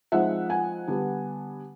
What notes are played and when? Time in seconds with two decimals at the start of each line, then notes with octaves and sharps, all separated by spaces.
0.12 F3 G#3 C4 D#4 E5 F#5
0.49 F#5 G#5
0.88 D3 G3 B3 D4